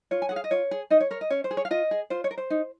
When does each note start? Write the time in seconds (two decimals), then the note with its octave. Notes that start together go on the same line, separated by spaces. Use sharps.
0.11 F4 C#5
0.22 G#5
0.29 G#4 F#5
0.36 F5
0.44 D#5
0.51 F4 C#5
0.71 G#4
0.90 D#4 D#5
1.00 C#5
1.11 A#4 C#5
1.21 D#5
1.30 C#4 C#5
1.44 C5
1.51 G#4
1.57 C#5
1.65 F5
1.71 F4 D#5
1.91 G#4
2.10 F4 C5
2.24 C#5
2.31 A#4
2.38 C5
2.50 D#4